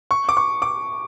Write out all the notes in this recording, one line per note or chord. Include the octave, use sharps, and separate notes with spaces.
C#6
D6
C#6
D6